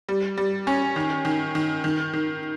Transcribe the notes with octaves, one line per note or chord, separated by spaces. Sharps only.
G3
G3
C#4
D#3
D#3
D#3
D#3
D#3